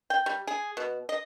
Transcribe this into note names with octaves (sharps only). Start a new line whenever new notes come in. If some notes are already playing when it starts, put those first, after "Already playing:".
G5
G3
G#4
B2
D#5